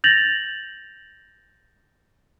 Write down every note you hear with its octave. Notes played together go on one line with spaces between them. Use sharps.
G6 A6 A#6 F7 F#7